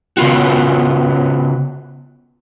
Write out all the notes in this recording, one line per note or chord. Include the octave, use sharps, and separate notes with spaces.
C#3 B3 F4 F#4